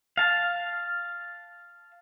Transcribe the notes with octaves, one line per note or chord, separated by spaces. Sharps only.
F5 A5